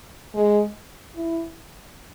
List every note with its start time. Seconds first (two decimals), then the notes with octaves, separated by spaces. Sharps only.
0.34 G#3
1.15 E4